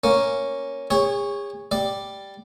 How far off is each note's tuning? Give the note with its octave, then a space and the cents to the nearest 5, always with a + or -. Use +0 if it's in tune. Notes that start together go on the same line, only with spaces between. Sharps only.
A#3 +0 C#4 +0
G#4 -40 C#5 +0
G3 +0 D5 +5